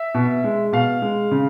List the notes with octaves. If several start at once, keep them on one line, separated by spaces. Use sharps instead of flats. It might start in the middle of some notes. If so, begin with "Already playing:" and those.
Already playing: E5
B2
G#3
B2 F5
G#3
C#3